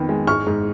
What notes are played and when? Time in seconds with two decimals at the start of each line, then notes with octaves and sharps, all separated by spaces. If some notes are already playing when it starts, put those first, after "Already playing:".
Already playing: F2 D#3 B3
0.09 G#3
0.27 G#2 C#6 F6
0.47 G#2